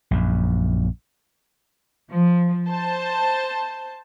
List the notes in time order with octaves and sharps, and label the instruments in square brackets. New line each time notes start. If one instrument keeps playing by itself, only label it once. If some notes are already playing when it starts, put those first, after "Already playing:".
[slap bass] A#1 F#2
[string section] F3
C5 A5